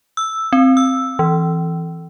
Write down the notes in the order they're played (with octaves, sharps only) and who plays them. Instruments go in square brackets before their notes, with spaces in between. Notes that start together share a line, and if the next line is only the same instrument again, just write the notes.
[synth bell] E6
C4
E6
E3